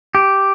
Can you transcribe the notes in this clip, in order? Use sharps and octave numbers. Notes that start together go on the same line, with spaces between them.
G4